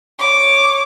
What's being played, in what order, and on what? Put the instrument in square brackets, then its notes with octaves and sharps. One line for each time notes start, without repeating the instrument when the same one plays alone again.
[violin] C#5 D6